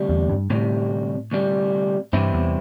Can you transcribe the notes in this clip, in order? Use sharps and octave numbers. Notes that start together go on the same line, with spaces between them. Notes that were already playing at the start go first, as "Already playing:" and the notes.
Already playing: D2 C3 G3
E2
G2
D2 A2 C3 G3
D2 C3 G3
C2 G2 C3 E3 C4 E4
E2